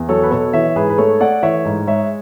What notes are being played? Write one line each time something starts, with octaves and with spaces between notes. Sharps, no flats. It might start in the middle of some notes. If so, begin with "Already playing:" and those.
Already playing: E2
F#3 A4 C#5
B4
B2 A4 C#5
E3 C#5 E5
G#2 G#4 B4
B4
A3 A4 C#5
A3 D5 F#5
E3 C#5 E5
G#2
G#3 C#5 E5